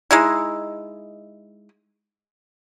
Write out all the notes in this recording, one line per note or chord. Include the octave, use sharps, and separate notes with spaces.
G#3 D#4 E4